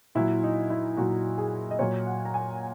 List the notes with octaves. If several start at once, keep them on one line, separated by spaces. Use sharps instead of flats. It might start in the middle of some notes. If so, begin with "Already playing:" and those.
A#2 F#3 E4
D#4
E4
A#2 F#3 F#4
G#4
D#5
A#2 F#3 C#5
F#5
A#5
G#5